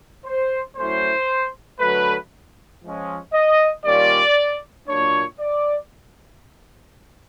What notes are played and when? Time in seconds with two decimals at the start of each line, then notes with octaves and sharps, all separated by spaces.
0.26 C5
0.77 A2 F#3 A3 C#4 E4 C5
1.80 D3 F#3 A3 B4
2.83 F3 G#3 C#4
3.34 D#5
3.85 D#3 G3 A#3 C#4 F4 D5
4.88 A#2 F#3 A#3 D4 C#5
5.40 D5